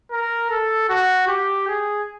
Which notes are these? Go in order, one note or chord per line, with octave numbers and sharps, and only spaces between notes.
A#4
A4
F#4
G4
G#4